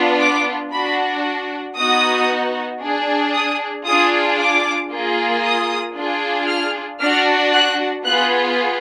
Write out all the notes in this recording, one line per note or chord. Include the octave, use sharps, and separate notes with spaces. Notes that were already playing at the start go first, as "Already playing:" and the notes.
Already playing: B3 D4 F4
D6
D4 F#4 B5
B3 D#4 F#4 D#6
D4 G#4
D#6
D4 F4 G#4 D#6
D6
A#3 F4 G#4
D#6
D4 F4 G#4
F6
D4 F#4 F6
F#6
B3 F4 G#4 F#6